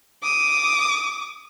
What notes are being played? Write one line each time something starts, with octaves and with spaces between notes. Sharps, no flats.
D6 D#6